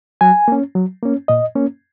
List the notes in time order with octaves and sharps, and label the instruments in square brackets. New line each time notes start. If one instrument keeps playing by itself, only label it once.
[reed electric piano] F#3 G#5
A#3 C#4
F#3
A#3 C#4
A#2 D#5
A#3 C#4